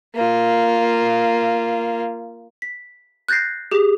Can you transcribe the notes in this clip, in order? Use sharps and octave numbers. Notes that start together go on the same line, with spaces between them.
A#3 F4
B6
F#6 G6 A6 A#6 C7
G4 G#4